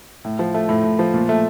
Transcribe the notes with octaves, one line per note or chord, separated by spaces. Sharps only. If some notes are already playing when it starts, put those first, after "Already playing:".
A2
F3
A3
A2
A2
F3
A#2
A3